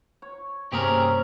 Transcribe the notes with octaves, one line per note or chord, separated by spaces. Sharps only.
C#5
G2 C3 A#3 C4 C#4 G4 G#4 A#4